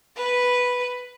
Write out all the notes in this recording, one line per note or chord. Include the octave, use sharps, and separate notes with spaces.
B4